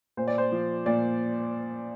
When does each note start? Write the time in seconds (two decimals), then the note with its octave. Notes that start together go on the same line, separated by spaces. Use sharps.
0.17 A#2 C5
0.28 D5
0.38 C5
0.52 F3
0.86 A#2 D5